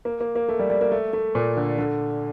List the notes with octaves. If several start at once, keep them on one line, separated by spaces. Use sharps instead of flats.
A#3
A#3
A#3
A3
G3
G3
A#3
A3
A3
A#2
D3
D3